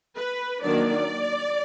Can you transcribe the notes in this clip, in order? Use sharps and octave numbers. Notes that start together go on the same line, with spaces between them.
B4
D#3 F#3 A#3 D4 D5